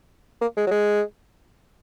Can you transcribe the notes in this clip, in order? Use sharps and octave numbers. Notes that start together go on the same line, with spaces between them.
A#3
G#3
F#3
G#3